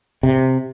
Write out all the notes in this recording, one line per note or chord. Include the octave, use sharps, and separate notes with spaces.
C3